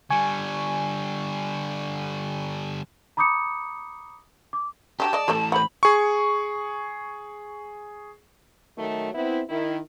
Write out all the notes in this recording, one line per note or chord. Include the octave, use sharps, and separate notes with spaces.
D3 G3 G#5 C#6
A#5 B5 D6 D#6 G6 C#7
D6
F#3 B3 D4 G4 A5
G#3 D5 D#5
E3 A3 G4 A4 D5
C5 F#5 B5
G#4 C#6
D#3 F#3 A3
B3 C4 E4
D#3 E4